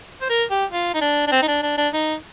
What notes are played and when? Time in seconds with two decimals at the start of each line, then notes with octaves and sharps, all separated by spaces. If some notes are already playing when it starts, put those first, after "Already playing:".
0.21 C5
0.30 A#4
0.50 G4
0.71 F4
0.94 D#4
1.01 D4
1.27 D4
1.32 C4
1.42 D#4
1.48 D4
1.63 D4
1.78 D4
1.93 D#4